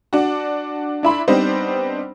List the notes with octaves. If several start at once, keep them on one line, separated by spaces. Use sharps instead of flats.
D4 F#4
D4 E4 B5 C6
G3 B3 C4 D4 D#4 C5